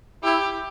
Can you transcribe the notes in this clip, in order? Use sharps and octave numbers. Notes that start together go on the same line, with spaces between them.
E4 G4